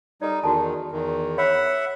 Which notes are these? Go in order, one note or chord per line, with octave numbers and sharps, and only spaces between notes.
G3 D#4 A4 D5
E2 D#3 F#4 A4 A5
E2 D#3
C#5 E5 F#5 B5